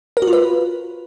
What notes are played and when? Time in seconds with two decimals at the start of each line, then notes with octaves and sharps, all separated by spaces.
0.17 A#4
0.22 F#4
0.27 F4
0.33 B4